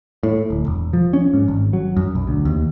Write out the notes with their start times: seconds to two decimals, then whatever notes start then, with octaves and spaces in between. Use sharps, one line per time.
0.23 A2
0.50 D1
0.66 E1
0.93 F3
1.13 C#4
1.33 G#2
1.48 G#1
1.73 F#3
1.97 F#2
2.15 B1
2.27 D2
2.45 D#2